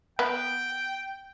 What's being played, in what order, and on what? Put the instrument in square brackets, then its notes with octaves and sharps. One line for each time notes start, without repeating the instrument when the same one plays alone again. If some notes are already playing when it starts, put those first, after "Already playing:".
[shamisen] B3 [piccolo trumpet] G5